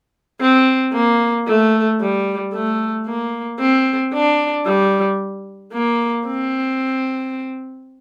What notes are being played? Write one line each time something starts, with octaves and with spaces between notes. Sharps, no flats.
C4
A#3
A3
G3
A3
A#3
C4
D4
G3
A#3
C4